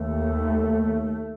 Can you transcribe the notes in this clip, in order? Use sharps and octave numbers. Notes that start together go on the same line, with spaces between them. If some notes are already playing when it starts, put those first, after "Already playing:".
Already playing: D#2 A3